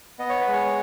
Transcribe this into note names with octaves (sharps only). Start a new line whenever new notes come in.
B3 D#5
C#5
B4
G#3
C#5